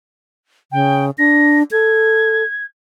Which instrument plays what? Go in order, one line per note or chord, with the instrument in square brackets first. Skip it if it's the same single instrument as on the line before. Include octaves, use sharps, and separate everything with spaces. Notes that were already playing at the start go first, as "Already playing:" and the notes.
[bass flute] C#3 [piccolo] G5
[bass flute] D4 [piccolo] A#6
[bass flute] A4 [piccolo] G#6